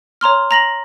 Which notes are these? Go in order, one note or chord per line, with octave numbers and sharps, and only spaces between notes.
C#5 A#5 C6 F6
A#5 A#6 F#7